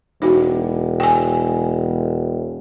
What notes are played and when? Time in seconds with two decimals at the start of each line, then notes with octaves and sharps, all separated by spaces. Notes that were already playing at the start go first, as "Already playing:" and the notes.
0.22 E1 D#4 F#4
1.00 G5 G#5